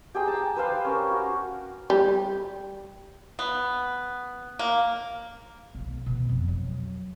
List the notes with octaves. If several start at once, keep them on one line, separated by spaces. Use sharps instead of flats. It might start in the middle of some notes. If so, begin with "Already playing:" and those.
G4 G#4 G5 A#5
A5
B4 C5 F5 C6
C#4 A#4
F#4
G3
B3
A#3
B1
B2
F2
F#3